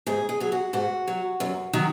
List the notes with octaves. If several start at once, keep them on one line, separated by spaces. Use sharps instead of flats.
G#2 G#4
G#4
F#3 G#4
F#4
G#2 F#4
F#3
F#2
D#3 F#3